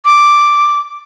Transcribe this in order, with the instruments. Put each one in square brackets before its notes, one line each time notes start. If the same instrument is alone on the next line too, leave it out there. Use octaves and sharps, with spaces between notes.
[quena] D6